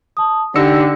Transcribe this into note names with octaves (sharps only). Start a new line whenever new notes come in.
A5 D#6
D3 D#4 G4 E6 A#6 C#7